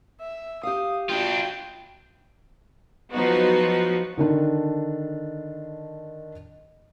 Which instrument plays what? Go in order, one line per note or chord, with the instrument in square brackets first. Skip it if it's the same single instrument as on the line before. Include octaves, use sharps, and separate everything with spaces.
[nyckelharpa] E5
[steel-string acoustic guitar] G4 F5 [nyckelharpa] D#6
[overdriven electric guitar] D4 F4 [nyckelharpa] F#4 G5
[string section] F3 F#3 B3 D#4 F#4
[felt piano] D3 D#3 D4